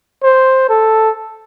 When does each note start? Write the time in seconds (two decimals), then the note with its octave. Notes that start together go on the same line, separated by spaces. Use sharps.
0.23 C5
0.69 A4